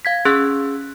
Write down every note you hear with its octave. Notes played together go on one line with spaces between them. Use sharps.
F5 G#6 B6
C#4 G#4 C6 E6 F#6